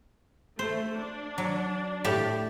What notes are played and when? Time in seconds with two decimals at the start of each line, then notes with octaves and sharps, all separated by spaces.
0.59 A3 C5
0.96 D4
1.38 F#3
2.04 A2 G4 A5